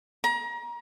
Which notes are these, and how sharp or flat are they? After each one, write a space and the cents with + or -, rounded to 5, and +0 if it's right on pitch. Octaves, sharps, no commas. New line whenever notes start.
A#5 +30